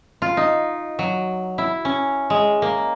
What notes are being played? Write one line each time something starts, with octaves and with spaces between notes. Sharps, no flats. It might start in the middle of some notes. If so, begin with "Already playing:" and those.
F4
D#4
F#3
E4
C#4
G#3
A#3